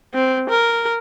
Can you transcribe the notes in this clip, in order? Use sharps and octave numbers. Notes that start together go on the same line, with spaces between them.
C4
A#4